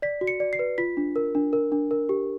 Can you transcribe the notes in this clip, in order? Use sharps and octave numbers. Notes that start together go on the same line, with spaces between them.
D5 B6
F#4
C#7
D5
C7
B4
F4 B6
D4
A#4
D4
A#4
D4
A#4
G4